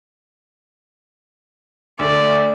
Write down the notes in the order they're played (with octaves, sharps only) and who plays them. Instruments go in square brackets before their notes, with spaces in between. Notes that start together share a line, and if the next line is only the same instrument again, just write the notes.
[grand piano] D2 D3 A3 [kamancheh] D5